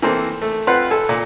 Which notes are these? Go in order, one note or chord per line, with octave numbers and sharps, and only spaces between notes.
E3 A#3 C4 A4
A3
C4 F4 B4 F#5
A4 G#5
A#2